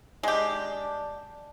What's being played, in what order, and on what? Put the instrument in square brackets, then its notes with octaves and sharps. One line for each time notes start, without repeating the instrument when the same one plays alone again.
[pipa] G#3 G4 [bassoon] D4